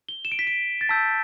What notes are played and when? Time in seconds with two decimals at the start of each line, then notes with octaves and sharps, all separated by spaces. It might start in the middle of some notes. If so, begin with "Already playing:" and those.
0.09 G7
0.25 E7
0.32 D7
0.39 B6
0.47 D7
0.81 A6
0.89 A5 E6 G6 B6